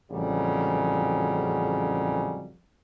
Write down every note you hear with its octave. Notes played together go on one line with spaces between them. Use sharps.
A1 F2 G#2 C#3 F#3 G3